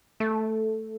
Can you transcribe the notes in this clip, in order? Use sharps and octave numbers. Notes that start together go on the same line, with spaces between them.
A3